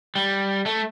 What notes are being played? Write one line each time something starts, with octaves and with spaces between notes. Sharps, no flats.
G3
A3